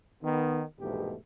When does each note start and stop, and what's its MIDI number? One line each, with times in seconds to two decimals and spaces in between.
0.23 0.62 51
0.23 0.62 59
0.80 1.15 34
0.80 1.15 40
0.80 1.15 44
0.80 1.15 47
0.80 1.15 57
0.80 1.15 67